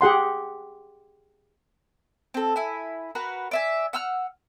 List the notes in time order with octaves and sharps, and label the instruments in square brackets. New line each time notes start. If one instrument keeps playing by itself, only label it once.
[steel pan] G4 G#4 F#5 C6
[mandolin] C4 A4
E4 G#5
F#4 A#4 B4
D5 E5 G#5
F#5 E6 F6